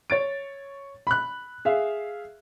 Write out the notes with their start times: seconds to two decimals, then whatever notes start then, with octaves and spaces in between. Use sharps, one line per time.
0.10 C#5 A6 D7
1.07 B5 F#6
1.65 G#4 E5 F5